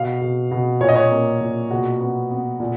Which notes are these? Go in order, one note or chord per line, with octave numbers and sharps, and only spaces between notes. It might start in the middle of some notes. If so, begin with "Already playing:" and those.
Already playing: B2 F5
B2
B2
A#2 C#5
D#5
C#5
A#3
A#2
B2 F#4
B3
B3
A#2